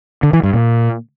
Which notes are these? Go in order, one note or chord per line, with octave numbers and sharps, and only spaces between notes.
D3
E3
G2
A#2